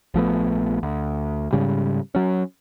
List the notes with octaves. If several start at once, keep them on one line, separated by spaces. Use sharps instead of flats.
A#1 F3 A3 B3
D2
G#2 C#3 G3
F#3 C#4